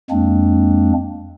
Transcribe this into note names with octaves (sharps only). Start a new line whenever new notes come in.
F2 G#3 A#3 C4 D4